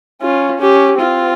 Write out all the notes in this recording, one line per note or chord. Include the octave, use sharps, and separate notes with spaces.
C#4 F4
C#4 G4
C4 F4